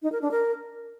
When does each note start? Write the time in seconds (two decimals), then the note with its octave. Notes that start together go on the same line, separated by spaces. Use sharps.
0.03 D#4
0.12 A#4
0.22 D4
0.31 A#4